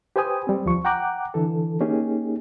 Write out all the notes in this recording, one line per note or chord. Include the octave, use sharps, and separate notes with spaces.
G4 B4 C5 G5 G#5 D#6
G3 C4
D2 F3 C#6
F#5 G5 A#5 D6 F#6
D3 E3 A4
A#3 C#4 D#4 G4 G#4